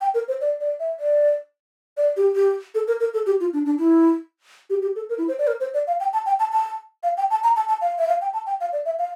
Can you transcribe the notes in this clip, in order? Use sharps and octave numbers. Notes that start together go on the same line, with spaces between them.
G5
A#4
C5
D5
D5
E5
D5
D5
G4
G4
A4
A#4
A#4
A4
G4
F4
D4
D4
E4
G4
G4
A4
A#4
E4
C5
D5
A#4
C5
D5
F5
G5
A5
G5
A5
A5
F5
G5
A5
A#5
A5
A5
F5
E5
F5
G5
A5
G5
F5
D5
E5
F5